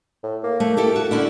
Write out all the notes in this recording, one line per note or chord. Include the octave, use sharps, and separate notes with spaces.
A2
A#3
A3
E4 G4 A4
F#4
D3 C#4 D4 E4